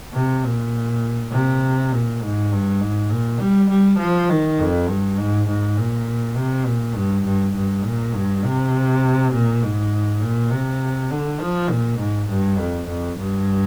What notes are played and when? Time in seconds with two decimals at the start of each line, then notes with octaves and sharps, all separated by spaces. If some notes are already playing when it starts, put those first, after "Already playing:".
0.14 C3
0.44 A#2
1.32 C3
1.92 A#2
2.22 G#2
2.52 G2
2.80 G#2
3.10 A#2
3.39 G3
3.70 G3
3.99 F3
4.29 D#3
4.59 F2
4.88 G2
5.18 G#2
5.48 G#2
5.77 A#2
6.36 C3
6.66 A#2
6.95 G2
7.25 G2
7.55 G2
7.84 A#2
8.14 G2
8.44 C3
9.33 A#2
9.62 G#2
10.21 A#2
10.51 C3
11.11 D3
11.40 F3
11.70 A#2
11.98 G#2
12.29 G2
12.58 F2
12.87 F2
13.17 G2